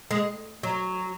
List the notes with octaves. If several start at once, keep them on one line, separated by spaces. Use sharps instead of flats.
G#3
F#3